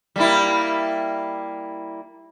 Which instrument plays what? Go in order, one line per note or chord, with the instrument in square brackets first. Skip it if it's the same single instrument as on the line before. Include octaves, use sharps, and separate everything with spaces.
[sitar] G3 A#3 E4